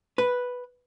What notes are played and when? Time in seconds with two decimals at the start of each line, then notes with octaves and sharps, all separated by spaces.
0.18 B4